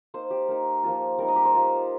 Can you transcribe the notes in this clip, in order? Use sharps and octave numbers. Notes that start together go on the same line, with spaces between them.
A#3 D#4 C5
G4
A#3 D#4
F3 A#3 F4
G3 D#4 A#4
D#5
G4
C5
A#3 F4